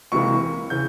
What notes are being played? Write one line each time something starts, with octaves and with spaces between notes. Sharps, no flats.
C#2 C3 E3 A#3 C#6
C#3 E3 G6